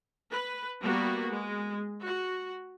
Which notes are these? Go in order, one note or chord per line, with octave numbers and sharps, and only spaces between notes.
B4
G3 A#3 B3 F#4
G#3
F#4